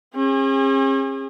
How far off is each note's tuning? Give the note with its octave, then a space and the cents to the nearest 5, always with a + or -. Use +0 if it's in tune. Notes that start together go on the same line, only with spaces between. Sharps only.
C#4 -45 G#4 -35